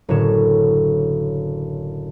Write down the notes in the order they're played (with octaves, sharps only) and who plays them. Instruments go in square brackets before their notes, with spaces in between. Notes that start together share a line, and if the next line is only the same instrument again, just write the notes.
[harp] F#1 A2 D3 C#5 E7